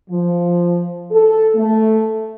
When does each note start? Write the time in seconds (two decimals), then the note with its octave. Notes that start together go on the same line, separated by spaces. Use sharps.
0.10 F3
1.11 A4
1.56 A3